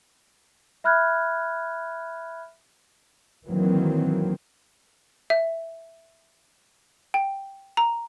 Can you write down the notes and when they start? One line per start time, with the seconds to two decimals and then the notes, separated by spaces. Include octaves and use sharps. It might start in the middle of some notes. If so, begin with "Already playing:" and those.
0.84 E5 B5 F6 F#6 G#6
3.48 D#3 E3 F#3 A#3 C4
5.30 E5
7.14 G5
7.77 A#5